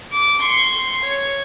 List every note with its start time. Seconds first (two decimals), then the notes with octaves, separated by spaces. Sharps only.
0.12 D6
0.41 C6 C#6
1.05 C#5